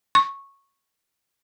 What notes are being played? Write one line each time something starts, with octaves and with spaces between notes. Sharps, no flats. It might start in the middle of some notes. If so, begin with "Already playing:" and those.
C#6